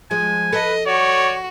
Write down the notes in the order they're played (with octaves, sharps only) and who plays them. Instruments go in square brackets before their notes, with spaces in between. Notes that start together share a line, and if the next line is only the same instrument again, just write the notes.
[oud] F3 G#3 [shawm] G#5
[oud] A4 [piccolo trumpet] B4 [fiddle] D#5
[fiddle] F#4 [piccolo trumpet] C#5 [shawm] D5